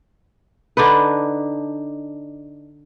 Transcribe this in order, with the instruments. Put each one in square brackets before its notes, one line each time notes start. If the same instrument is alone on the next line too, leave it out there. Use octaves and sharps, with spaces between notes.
[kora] D3 D4 D#4 B4